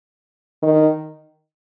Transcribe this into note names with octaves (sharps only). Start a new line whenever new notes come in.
D#3